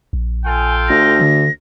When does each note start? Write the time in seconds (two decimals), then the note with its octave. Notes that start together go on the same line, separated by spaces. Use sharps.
0.13 A#1
0.45 F4 A4 G5 G#5
0.89 D2 A#6
1.20 D3